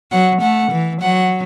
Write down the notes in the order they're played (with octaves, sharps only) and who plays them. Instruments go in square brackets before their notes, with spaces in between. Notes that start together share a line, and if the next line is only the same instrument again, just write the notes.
[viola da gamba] F#3 [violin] F#5
[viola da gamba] A3 [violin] F#5
[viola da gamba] E3
[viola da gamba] F#3 [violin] F#5